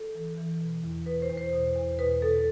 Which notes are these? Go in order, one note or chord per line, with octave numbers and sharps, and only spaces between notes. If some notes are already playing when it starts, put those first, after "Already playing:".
Already playing: A4
E3
E3
B2
E2
B2 B4
C5
E2
C5
B2
E2
B2 B4
B2 A4